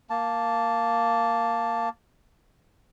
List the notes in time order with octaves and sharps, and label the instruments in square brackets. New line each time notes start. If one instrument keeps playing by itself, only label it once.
[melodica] A#3 A5